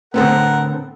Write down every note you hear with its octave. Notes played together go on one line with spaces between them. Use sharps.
A2 D3 B3 C4 A4 A#4 F#5